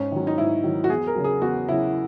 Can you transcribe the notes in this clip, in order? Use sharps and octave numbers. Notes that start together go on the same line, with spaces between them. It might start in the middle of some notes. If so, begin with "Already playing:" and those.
Already playing: G#2 C#4
D#3 F#3
D#4
G#2 E4
D#3 F#3
F#4
E2 G#4
A#4
C#3 F#3
G#4
E2 F#4
C#3 F#3 E4